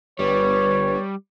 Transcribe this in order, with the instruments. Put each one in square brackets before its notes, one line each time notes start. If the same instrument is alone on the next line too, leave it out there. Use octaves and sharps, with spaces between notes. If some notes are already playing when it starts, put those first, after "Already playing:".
[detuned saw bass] G1 [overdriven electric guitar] G3 [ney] B4 [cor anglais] C#5